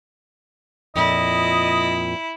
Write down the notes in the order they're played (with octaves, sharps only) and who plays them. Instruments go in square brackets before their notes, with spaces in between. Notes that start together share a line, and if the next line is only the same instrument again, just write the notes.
[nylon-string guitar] F2 A#2 [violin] E4 [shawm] D#5